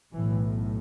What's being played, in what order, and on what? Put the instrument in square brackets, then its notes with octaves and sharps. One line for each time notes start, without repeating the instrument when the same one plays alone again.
[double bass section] B1 A2 E3